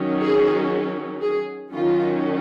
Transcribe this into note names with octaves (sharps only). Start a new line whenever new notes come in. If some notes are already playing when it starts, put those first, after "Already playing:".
Already playing: D#3 F#3 C#4
G#4
G#4
D#3 F#3 C#4 F4